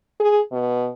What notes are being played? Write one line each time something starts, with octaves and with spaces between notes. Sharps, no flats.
G#4
B2